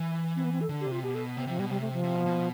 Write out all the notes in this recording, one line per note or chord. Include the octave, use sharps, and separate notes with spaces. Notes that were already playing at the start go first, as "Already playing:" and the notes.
Already playing: E3
C4
B3
C4
A4
D3
G4
C3
F4
B2 G4
A4
C3 B3
C3 F3
B2 G3
C3 G3
A3
F3
C3
B2
B2